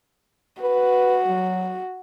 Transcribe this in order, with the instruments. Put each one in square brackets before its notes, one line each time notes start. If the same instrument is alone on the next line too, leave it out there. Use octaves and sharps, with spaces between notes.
[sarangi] F#4 [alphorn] B4
[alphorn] F#3